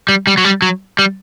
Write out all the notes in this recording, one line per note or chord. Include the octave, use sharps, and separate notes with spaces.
G3
G3
F#3
G3
F#3
G3